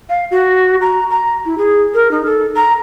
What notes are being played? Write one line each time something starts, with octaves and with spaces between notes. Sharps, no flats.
F5
F#4
A#5
A#5
E4
G#4
A#4
D#4
A4
A#5